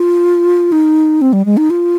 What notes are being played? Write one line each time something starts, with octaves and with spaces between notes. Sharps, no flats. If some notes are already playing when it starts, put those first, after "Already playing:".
Already playing: F4
D#4
C4
G3
G#3
D#4
F4